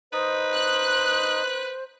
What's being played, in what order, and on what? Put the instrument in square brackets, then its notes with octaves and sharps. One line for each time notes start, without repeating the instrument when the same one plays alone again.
[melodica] D#4 D#5 [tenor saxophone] B4 [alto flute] C5
[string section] F#6